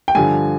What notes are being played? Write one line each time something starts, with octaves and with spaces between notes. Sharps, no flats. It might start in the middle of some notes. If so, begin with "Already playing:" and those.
G5
G2 D3 F3 G#5